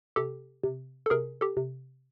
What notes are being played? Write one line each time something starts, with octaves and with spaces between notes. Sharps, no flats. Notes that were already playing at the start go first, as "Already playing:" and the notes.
C3 G4 A4
C3
A4
C3 G#4 A#4
G4 A4
C3